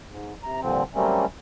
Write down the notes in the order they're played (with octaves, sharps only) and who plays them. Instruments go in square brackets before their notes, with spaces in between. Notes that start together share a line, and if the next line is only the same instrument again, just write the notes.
[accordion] G#2
C3 A#5
G2 A#2 D3 F3 C4
F#3 G3 A3 A#3 C4 C#4